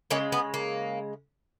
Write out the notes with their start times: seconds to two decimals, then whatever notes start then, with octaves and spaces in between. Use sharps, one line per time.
0.10 C#3 G#3 A#3 C#4
0.32 B3
0.54 A#3